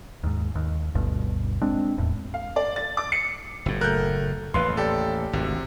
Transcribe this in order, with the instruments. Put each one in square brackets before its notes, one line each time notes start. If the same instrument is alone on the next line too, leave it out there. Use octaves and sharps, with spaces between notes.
[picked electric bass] D#2 G#2
D#2
G1 D2 G2 B2
G#3 C4 D4
D#1 E2 A2
[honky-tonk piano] F5
D5
A6
D6
C#7
[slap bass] F#1 A2
[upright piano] A3 F#6 [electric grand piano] A#4 G6
[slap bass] A1 D#2 [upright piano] B4 F5 [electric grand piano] C6
[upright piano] G4 D5 [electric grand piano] A4
[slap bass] G#1 D2 [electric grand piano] C3